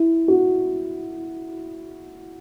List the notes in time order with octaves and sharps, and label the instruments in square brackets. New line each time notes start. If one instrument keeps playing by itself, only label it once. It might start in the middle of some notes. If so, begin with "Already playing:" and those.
Already playing: [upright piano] E4
F#4